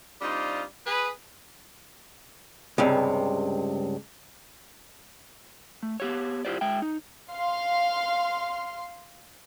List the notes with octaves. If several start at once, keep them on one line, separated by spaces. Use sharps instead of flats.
G3 C4 D4 D#4 F4
G#4 B4
C#2 G2 C3
A3
B3 G4 C#5
E4 F4 G4 C5 D5
G#3 E5 G5
D#4
F5 C6